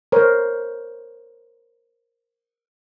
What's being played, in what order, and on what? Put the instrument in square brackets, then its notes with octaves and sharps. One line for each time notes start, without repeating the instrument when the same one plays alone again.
[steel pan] A#4 C5 C#5